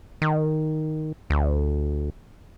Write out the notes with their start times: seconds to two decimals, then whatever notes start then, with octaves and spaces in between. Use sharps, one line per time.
0.22 D#3
1.30 D2